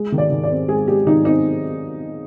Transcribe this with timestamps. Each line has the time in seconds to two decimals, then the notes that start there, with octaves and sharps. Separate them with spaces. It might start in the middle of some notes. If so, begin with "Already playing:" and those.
Already playing: G#3
0.12 D#3
0.18 D5
0.31 D#3
0.43 D5
0.50 C4
0.68 G#3 G#4
0.88 G#3 G4
1.06 D#3 D#4
1.25 C4 D#4